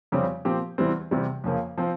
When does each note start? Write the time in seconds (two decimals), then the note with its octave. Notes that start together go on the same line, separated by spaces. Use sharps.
0.12 F2 C#3 G3 C4 G4
0.45 A#2 F3 C4 G4
0.78 E2 E3 G3 C4
1.11 E2 C3 G3 C4
1.44 F2 C#3 F3 A#3
1.78 F3 C4